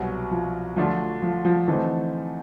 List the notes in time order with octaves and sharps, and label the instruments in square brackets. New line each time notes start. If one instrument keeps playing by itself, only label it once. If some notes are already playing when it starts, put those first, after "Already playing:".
Already playing: [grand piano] C2 B2 F#3 [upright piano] G3
[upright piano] F3
[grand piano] D3 F#3 A3 D4 F4 [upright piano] F3
[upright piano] F3
F3
[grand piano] D3 F3 A3 C4 D#4 [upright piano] E3